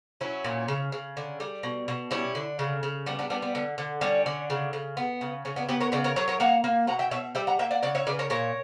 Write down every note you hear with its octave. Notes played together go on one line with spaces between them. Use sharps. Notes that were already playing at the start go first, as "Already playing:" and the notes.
F#3 C#4 E4
A#2
C#3
C#3
D3
G3
B2
B2
G3 C#4 E4
D3
C#3
C#3
G3 B3 D4
B3 D4
G3 B3 D4
B3
D3
D3
G3 C#4
D3
C#3
C#3
B3
C#3
C#3 C#4
B3 D4
B3 G4 B4
A#4 C#5
C#3 B4 D5
A#4 C#5
F#3 A#4 C#5
A#4 C#5
A#3 F#5 A#5
A#3
B2 F#5 A#5
E5 G5
B2 C#5 E5
G3 E5 G5
F#5 A#5
A#3 E5 G5
D5 F#5
C#3 D5 F#5
C#5 E5
C#3 B4 D5
A#4 C#5
A#2 A#4 C#5